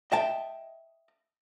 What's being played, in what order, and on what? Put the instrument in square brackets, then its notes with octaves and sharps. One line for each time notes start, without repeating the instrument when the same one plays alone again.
[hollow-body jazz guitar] D#5 E5 G5 A5